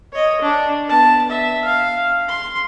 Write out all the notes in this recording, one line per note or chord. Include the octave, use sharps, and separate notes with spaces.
C#5 D#5
D4
B3 A5
E5
F5
C6